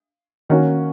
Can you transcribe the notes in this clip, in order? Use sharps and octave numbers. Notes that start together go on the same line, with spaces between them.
D#3 A#3 C#4 F#4